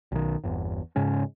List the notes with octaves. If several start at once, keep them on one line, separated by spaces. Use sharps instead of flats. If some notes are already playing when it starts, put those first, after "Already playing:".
B1 D#3
G1 E2
G#2 C#3 C#4